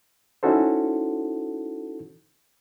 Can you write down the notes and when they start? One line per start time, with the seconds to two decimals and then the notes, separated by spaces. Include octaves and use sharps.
0.43 C#4 D#4 E4 F#4 A4 C5